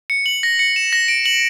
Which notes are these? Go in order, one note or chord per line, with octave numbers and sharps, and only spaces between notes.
C#7
F#7
A#6
C#7
E7
A#6
D7
F#7